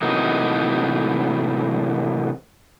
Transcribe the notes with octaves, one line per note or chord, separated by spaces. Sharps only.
A2 C3 E3 F#3 A#3 D#4